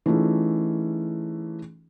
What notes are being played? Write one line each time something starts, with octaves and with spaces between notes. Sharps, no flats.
E3 A3 C#4 D#4 F4 G#4